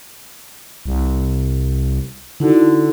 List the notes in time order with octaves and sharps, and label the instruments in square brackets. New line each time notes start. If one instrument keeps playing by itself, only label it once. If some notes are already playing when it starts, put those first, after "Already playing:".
[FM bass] C2
[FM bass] D3 [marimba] D#4 E4 F#4